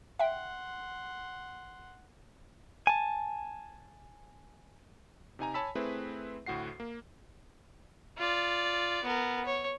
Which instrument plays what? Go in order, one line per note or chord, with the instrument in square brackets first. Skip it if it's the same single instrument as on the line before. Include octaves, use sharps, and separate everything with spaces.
[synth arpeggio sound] E5 G5 [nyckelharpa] F#5 C6
[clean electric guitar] G#5 A5
[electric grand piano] C3 D#4 G#5 A#5
C#5 G#5 A5 B5 E6 B6
A3 C4 E4 G#4 B4 E5
D2 A2 F#4 F#5 C7
A#3
[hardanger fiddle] F4 D5
B3 A#4
C#5